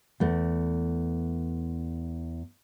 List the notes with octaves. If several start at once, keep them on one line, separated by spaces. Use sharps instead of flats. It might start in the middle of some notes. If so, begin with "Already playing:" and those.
E2 A3